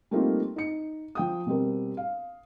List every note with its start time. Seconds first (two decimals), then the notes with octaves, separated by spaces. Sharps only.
0.11 G3 A3 A#3 C4 D#4 F4
0.56 D#4 C#7
1.15 F3 G5 D#6
1.46 B2 G3 C4 A#4
1.97 F5